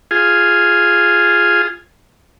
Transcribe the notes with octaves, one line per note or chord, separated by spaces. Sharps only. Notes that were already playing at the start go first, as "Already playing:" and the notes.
F4 G#4